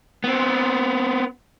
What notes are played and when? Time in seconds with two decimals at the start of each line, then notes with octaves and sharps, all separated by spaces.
0.24 B3 C4